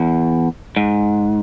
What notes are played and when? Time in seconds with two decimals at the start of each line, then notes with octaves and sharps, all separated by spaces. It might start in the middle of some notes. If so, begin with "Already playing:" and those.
Already playing: E2
0.76 G#2